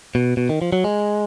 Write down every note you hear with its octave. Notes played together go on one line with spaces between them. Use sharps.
B2
B2
D#3
F3
F#3
G#3